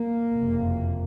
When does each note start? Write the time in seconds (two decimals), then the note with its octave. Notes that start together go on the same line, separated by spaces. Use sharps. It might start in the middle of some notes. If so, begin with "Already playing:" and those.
Already playing: A#3
0.31 F#1 F2 C3